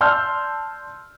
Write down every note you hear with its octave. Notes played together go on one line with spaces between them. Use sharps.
D5 A5 C6 E6 F6 G6